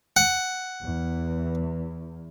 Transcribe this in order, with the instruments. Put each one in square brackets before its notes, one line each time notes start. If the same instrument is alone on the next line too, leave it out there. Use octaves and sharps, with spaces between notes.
[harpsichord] F#5
[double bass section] E2